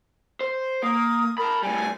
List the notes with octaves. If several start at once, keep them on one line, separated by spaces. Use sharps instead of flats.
C5
A#3 D#6
A#4 A5 B5
A2 G3 G#5